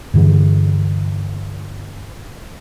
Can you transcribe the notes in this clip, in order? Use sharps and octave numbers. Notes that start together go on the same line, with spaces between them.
G2 D3 E3